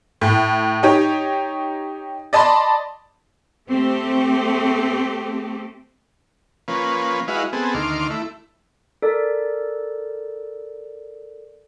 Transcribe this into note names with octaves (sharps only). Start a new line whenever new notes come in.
A2
D#4 G4 C#5
D5 D#5 A5 B5 C6
A3 C4 G4
F3 A#3 C#4 B4
G#3 E4 F#4 B4 D#5 F5
B3 C4 G#4 A4
D2 D#3 C6 D6 F6
A3 E4
A4 A#4 D5